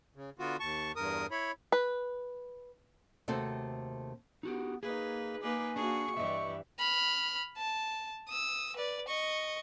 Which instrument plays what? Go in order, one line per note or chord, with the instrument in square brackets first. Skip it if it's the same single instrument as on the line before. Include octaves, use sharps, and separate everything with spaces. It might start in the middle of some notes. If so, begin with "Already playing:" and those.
[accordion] C#3
D3 B3 F4 F#4
D#2 A5 C#6
E2 G2 A#4 D#6
E4 C#5 B5
[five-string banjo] B4
[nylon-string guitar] D#2 C3 A3 C4 F#4 A4
[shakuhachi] B3 [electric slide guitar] D#4 F#4 G4
[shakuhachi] A#3 [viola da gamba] D#4 B4 [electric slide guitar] G#4
[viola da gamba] A#3 D#4 B4 [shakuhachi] G#5 [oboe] D6
[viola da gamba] A#3 F#4 G#4 [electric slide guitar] D4 [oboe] C#6
[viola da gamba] G2 E3 G3 [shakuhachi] D#5 [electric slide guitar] E5
[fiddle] B5 F6
A5
D#6 E6
B4 D5
D#5 C#6